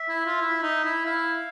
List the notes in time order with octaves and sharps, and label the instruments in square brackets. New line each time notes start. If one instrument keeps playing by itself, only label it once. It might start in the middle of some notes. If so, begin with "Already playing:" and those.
Already playing: [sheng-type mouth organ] E5
[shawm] E4
F4
E4
D#4
E4
[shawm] E4 [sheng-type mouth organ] F5